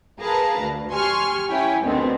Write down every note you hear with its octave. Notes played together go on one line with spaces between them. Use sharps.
G#4 A#4 B4 F5 A5 A#5
D2
G4 G#5 C6 C#6 F6
C#4 E4 G4 C#5 G5 G#5
D2 B2 D3 D#3 B3 C4